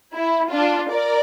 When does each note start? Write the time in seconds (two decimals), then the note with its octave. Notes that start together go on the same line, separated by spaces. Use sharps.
0.13 E4
0.51 D4 F4
0.90 A#4 D5